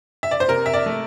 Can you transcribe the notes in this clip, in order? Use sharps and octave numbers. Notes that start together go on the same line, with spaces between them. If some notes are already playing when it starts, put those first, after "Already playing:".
E5
D5
C5
C3 A#4
E5
D5
A3